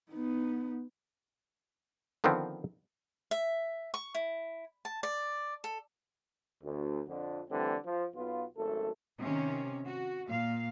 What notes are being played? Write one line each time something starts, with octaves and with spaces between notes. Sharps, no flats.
B3 D#4
D3 D#3 F3 B3 C4
E5
C#6
E4
A5
D5
A4
D2
F2 D3
D3 E3 G3 A3 C4
F3
B1 B3 F4
G#1 F#2 A3 A4
C3 D#3 C#4
F#4
A#2 F5